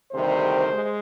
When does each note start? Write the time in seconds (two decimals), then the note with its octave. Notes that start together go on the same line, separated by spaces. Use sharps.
0.12 D2 C3 D#3 G3 C5
0.71 G#3